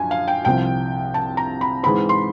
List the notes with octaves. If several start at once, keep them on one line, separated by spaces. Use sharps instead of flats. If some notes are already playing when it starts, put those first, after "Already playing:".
Already playing: F#2 D3 F3 G#5
F5
G5
C2 C3 F3 G5
A5
A#5
B5
G#2 E3 G#3 C4 B5
C6